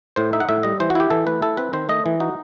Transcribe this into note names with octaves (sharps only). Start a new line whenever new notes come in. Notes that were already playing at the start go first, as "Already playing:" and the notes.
A2 C5
D#4 E5
F#5
A2 E5
G3 D#5
E3 C5
F#4
E4 G4
E3 A4
A3 B4
E4 A4
C4 B4
D#3 C5
A3 D#5
E3
D#4 F#4